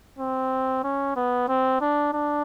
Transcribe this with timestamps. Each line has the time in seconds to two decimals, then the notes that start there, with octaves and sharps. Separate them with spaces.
0.19 C4
0.84 C#4
1.16 B3
1.48 C4
1.81 D4
2.14 D4